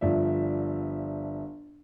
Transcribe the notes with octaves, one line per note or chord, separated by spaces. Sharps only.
G1 F3 D5 E5